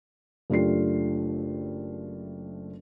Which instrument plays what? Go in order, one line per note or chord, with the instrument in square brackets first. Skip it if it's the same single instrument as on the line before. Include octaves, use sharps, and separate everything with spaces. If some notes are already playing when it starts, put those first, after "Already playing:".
[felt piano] F#1 A3 D4 F4 G4 C7